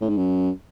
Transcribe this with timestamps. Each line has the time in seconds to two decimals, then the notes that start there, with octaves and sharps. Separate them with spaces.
0.01 A2
0.09 G#2
0.17 F#2